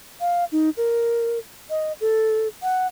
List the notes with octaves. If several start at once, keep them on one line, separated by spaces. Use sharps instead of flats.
F5
D#4
A#4
D#5
A4
F#5